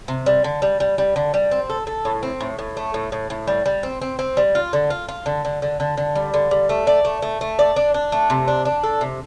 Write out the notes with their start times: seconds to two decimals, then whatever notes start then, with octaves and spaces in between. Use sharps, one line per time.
0.08 C3
0.26 G3
0.44 D3
0.62 G3
0.80 G3
0.98 G3
1.16 D3
1.34 G3
1.51 C4
1.70 A4
1.87 A4
2.05 A2
2.23 C4
2.40 A2
2.59 A2
2.77 A3
2.94 A2
3.12 A2
3.30 A2
3.47 G3
3.66 G3
3.83 C4
4.01 C4
4.19 C4
4.37 G3
4.55 F4
4.73 D3
4.90 F4
5.09 F4
5.26 D3
5.45 D3
5.62 D3
5.80 D3
5.97 D3
6.15 G3
6.34 D3
6.51 G3
6.69 A3
6.87 D5
7.05 A3
7.22 A3
7.41 A3
7.59 D5
7.76 D4
7.94 D4
8.12 A3
8.30 C3
8.48 D4
8.65 D4
8.83 A4
9.01 C3